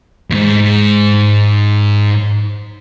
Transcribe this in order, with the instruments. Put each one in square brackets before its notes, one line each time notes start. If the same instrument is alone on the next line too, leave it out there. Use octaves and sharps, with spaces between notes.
[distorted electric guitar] D#2 G#2